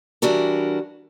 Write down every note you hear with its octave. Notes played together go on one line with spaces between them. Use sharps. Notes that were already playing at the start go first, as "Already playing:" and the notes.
E3 G3 D4 F#4 A#4